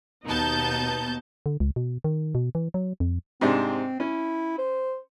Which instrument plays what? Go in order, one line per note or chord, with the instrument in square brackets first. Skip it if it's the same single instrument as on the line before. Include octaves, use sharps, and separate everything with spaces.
[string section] D#2 B2 B3 D#4 A5 G6
[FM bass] D3
C#2
B2
D#3
B2
E3
F#3
F2
[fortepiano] G#2 C3 D4 [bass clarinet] C4
[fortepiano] C#4 [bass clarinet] E4
[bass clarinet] C5